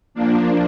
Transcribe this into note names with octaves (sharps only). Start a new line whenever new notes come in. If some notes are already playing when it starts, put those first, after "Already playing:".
F3 A#3 D4